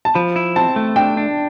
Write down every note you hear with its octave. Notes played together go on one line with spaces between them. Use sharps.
A5
F3 B5
E4
C4 A5
A3
D4 G5
D4